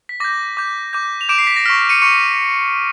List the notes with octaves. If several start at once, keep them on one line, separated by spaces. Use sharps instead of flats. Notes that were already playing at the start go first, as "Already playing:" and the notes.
B6
D6 G6 A#6
D6 G6
D6 G6
F7
D6 G6 D7 E7
C7
B6
A#6
C#6 F6 B6
B6
C#7 D#7
C#6 F6 C#7 D#7